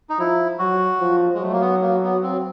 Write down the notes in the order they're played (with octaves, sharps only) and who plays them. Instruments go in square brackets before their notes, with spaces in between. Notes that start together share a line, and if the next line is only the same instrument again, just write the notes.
[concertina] D#4
[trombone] F3 [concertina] E4
[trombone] F#3 [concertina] F#4
[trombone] F3
[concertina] G#3
[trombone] F#3 [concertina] A3
[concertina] A#3
B3
A#3
B3
C4